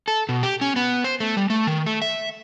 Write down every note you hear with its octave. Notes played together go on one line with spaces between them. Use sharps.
A4
B2
G4
C#4
B3
C5
A3
G3
A3
D#3
A3
E5